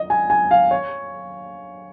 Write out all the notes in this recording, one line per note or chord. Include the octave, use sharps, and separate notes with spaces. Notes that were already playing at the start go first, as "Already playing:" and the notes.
Already playing: D#5
G#5
G#5
F5
C#5